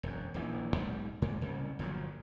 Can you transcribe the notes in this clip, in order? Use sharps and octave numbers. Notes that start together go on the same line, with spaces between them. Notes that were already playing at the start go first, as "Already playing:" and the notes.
E1 F#2
D#1 A#1 E3
B1 G#2 G3
G#2 G#3 A#3
C2 C#3
G1 A#2 F3 F#3